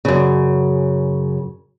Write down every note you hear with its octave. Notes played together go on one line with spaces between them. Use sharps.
F#2 C#3